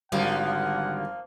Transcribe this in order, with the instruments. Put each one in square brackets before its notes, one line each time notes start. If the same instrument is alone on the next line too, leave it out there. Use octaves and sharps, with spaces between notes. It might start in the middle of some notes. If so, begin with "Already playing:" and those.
[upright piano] G#1 [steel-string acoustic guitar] D3 D#3 G3 [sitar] F3 A#3 [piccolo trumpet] F#5